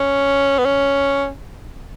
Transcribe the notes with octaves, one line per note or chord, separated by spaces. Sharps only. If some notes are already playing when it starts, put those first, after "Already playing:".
Already playing: C#4
B3
C#4